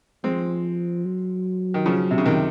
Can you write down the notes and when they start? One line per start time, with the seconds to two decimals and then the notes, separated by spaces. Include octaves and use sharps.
0.24 F3 G#3 C4
1.05 F#3
1.74 D#3
1.86 C#3 F3
2.11 C3
2.18 C#3
2.25 C3 D#3